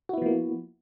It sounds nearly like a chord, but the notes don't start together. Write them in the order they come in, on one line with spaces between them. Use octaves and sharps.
F#4 E4 B3 F3 A#3